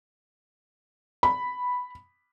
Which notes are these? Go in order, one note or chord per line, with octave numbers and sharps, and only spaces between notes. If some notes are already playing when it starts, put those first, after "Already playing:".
B5